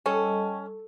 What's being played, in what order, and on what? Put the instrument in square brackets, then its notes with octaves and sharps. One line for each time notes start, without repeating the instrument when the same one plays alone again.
[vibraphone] G3 D#5 A5 [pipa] C#4 [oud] A4